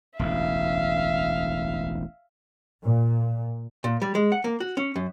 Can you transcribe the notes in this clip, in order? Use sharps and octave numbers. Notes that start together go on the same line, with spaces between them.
E1 A1 D2 E5 F5
A#2
A#2
G3
G#3
F#5
A#3
F#4
C#4
F#2